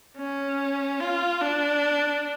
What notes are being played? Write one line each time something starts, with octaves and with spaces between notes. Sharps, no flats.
C#4
F4
D4